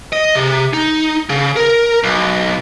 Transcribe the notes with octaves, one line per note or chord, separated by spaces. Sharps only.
D#5
C3
D#4
C#3
A#4
B1